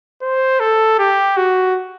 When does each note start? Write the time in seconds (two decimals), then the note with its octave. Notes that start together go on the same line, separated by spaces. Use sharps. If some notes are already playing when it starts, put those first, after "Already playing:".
0.22 C5
0.60 A4
0.99 G4
1.37 F#4